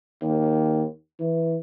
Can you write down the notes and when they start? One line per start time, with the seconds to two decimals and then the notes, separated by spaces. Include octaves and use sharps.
0.22 D#2
1.20 E3